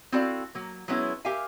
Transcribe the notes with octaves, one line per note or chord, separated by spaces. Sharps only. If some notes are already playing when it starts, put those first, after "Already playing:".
C4 E4 F#4 A4 D5 F5
F#3 A#3
F#3 G#3 B3 C#4 E4
G4 A#4 E5 F5 G#5